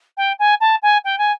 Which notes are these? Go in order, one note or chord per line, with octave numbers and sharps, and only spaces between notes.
G5
G#5
A5
G#5
G5
G#5